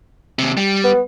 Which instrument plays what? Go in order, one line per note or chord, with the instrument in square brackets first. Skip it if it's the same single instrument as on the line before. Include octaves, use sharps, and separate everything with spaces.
[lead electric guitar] D#2 C3
G3
[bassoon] B3